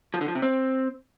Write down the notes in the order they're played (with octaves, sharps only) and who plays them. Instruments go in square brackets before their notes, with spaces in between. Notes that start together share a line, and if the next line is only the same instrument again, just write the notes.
[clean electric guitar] F3
D3
F3
C3
C4